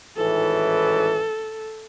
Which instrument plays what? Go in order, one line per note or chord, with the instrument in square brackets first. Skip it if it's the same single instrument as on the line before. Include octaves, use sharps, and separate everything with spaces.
[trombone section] G#1 A2 E3 [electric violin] A4